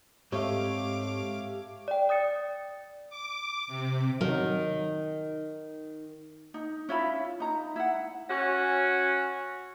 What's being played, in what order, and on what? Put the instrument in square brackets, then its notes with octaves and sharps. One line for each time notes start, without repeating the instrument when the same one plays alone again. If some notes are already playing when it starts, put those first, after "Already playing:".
[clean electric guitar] G#2 C4 D#5 [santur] A3 C#5 [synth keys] G4 [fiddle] F5 D6
[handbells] D5 G5
D5 D#6 A6 C#7
[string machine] D6
C3
[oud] D#3 [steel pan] F#3
[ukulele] D#4
C#4 E4 F4 B5
D#4 A#5
E4 F#5
[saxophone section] C#4 F#4